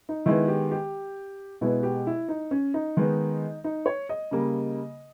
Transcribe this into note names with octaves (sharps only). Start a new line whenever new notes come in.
D#4
D#3 G#3 B3 E4
G4
G4
B2 G#3 B3 E4
G4
E4
D#4
C#4
D#4
D#3 G#3 B3
D#4
C#5
D#5
C#3 G3 A#3